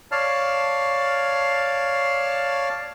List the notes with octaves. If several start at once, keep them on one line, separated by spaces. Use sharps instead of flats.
C#5 D5 F5 A5 F6